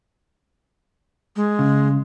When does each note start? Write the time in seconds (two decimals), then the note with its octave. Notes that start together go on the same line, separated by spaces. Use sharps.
1.36 G#3
1.59 C#3